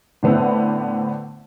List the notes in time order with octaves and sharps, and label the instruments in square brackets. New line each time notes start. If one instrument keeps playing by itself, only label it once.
[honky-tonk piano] A2 D3 B3 C4 E4